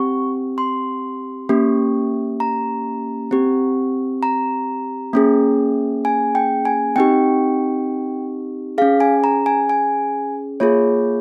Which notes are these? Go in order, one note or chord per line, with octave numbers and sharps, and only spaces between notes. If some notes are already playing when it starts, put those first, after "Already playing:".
Already playing: C4 G4 C#6
C6
A#3 C#4 G4
A#5
C4 G4
A#5
A#3 C#4 G#4
G#5
G5
G#5
C4 D#4 G4 G5
C#4 G#4 F5
G#5
A#5
G#5
G#5
A#3 F4 G#4 C#5